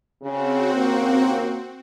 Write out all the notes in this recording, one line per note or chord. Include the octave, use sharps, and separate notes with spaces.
C#3 C4 F#4
D#2 C#3 A#3